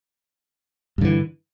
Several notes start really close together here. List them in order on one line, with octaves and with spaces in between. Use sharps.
G2 D3 E3